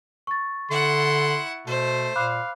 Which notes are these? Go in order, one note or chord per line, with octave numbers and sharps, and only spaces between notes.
C#6 A6
D3 E4 F#5 C6
B2 A3 C5
A#2 F5 B5 D6 F#6